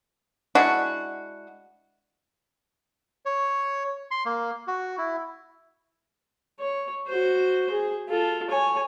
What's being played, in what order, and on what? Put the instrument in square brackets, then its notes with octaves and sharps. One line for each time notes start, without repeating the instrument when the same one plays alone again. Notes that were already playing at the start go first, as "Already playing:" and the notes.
[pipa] G#3 D4 E4 F#4
[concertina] C#5
C6
A#3
F#4
E4
[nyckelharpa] C#5
F#4 C5
G#4
F4 A4
C#5 G#5